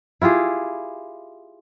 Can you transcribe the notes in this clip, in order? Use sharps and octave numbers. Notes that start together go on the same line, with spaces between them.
E4 F4 G4 G#4